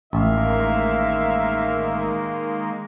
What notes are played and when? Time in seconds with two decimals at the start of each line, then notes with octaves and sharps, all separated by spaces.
0.13 A1 D#3 G#3 A#3 E5 F5